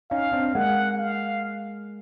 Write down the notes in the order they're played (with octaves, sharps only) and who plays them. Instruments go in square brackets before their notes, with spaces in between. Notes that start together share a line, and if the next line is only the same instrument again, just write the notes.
[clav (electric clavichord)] C#4 D#4 [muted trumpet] F5
[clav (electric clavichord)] C4 D4
[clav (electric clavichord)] G#3 A#3 [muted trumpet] F#5
[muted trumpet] F5